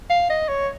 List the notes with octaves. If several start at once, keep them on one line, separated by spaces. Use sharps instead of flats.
F5
D#5
C#5